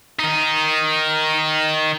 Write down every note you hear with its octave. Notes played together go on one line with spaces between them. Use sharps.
D#3 D#4